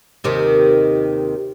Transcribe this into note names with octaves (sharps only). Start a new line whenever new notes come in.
D#2 C3 D#3